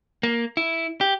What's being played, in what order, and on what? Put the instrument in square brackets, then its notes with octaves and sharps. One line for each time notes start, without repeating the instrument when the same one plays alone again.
[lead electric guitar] A#3
E4
G4